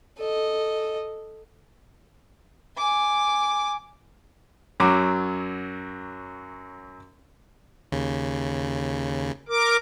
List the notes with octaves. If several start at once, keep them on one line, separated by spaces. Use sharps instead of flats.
A4 D#5
G#5 D6
F#2 F#3 D6
D#2 C#3
A#4 D6